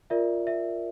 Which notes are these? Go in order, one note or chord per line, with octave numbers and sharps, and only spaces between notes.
F4 A#4 D5 E5
E5